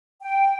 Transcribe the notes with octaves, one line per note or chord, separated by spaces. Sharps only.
G5